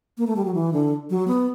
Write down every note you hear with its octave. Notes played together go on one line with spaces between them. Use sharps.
A#3
A3
G3
F#3
E3
D3
F#3
B3